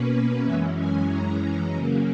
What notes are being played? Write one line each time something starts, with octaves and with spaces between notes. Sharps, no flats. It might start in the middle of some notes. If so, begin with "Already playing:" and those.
Already playing: B2 A#3 C#4 B4
F#2 E3 G#3 C#4 E5
G#5
F#2 E3 G#3 C#4 A#5
C#3 F#3 A#3 C#4